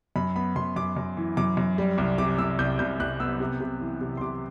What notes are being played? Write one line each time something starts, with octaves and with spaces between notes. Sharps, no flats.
F#2 B5
B3 B5
F#2 C6
F#2 D6
F#2
E3
F#2 D6
F#2
G3
C2
C3 D6
C2 E6
C2 G6
C2 G6
C2 F#6
B3 E6
C3
C3
E3
C3
C6
C3 D6